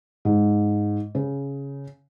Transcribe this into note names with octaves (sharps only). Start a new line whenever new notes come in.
G#2
C#3